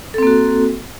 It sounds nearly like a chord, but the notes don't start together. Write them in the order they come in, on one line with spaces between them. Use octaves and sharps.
A4 C4 A#3 F#4